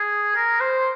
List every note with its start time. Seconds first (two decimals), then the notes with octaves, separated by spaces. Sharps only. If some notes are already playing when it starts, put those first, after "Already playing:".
Already playing: G#4
0.35 A#4
0.60 C5